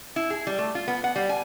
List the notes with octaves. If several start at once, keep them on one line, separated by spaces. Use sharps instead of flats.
E4
G#4
G3
A3
F4
B3
F#5
G3
G#5